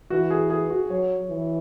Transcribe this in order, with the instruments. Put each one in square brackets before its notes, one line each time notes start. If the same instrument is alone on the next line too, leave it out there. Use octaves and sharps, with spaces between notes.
[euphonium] E3 [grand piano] F#4
[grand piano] G#4
G#4
F#4
[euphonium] F#3 [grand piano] C#5
[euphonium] E3